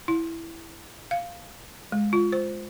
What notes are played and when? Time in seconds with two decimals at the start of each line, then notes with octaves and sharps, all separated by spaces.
0.08 E4
1.11 F5
1.92 G#3
2.13 F4
2.32 C5